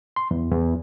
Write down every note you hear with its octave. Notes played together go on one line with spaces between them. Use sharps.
C6
E2
E2